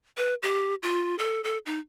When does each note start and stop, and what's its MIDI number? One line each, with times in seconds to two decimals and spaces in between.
0.17 0.34 71
0.42 0.75 67
0.83 1.17 65
1.19 1.41 69
1.44 1.58 69
1.66 1.79 63